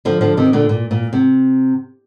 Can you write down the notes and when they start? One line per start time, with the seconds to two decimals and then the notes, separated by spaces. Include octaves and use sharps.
0.05 D3 F3
0.21 D3 F3
0.37 C3 D#3
0.53 A#2 D3
0.69 A#2
0.91 A#2
1.13 C3